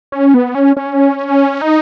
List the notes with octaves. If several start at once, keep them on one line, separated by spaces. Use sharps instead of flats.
C#4
B3
C#4
C#4
D#4